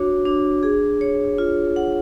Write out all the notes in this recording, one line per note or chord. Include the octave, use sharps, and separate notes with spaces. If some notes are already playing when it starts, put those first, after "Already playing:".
Already playing: D4 F#4 C#5
D4
G#4
C#5
F4
F#5